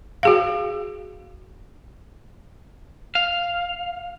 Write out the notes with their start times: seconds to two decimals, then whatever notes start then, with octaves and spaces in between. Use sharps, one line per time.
0.23 F#4 G#4 F5
3.15 F5